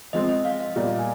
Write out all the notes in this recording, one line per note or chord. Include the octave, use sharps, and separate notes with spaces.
F3 G#3 C4 D#5
D#5
F5
D#5
A#2 G3 A#3
G#5